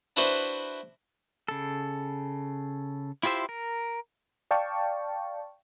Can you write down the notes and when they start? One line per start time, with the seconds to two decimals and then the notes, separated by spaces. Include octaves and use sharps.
0.16 D4 E4 F#4 B4 C5
1.48 C#3 A4
3.23 E4 F4 G4 C5 E5
3.49 A#4
4.51 D5 F5 G5 A5 C#6